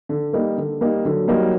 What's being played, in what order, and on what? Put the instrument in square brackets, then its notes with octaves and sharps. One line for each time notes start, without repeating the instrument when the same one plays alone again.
[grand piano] D3
G3 A#3 D#4
D3
G3 A#3 D#4
[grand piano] D3 [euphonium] F#3
[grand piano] G3 A#3 D#4